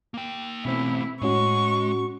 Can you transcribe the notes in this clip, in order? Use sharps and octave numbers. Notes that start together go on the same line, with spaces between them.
A#3 G5
B2 A3 C4 C#4 E4
A2 G#3 C#4 F#4 C#6